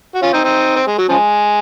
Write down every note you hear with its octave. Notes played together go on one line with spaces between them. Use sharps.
F#4
C#4 F4
C4 D#4
C4 D#4
C4
G#3
F#3
C#3 F3 G#3